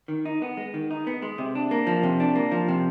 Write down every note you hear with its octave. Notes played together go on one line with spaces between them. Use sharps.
D#3
D#4
B3
G#3
D#3
D#4
B3
G#3
C3
D4
A#3
F3
C3
D4
A#3
F3
C3